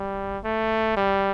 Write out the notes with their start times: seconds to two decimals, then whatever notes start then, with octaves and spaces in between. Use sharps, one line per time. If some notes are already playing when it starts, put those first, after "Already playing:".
Already playing: G3
0.44 A3
0.97 G3